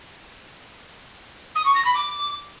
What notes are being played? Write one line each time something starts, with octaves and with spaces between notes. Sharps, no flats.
D#6
C#6
A#6
B5
D6